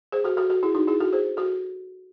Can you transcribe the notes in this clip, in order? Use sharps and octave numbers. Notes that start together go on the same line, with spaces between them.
G#4 C5
F#4 A4
F#4 A4
F#4 A4
E4 G#4
D#4 F#4
E4 G#4
F#4 A4
G#4 C5
F#4 A4